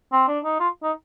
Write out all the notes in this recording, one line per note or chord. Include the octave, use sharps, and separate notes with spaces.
C4
D4
D#4
F4
D#4